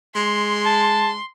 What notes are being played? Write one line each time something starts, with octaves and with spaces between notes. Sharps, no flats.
G#3 C6
A5